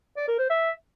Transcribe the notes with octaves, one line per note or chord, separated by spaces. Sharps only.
D5
A#4
C5
E5